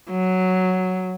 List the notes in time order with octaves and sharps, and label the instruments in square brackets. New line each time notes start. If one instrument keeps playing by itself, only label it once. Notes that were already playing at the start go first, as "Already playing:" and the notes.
[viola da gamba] F#3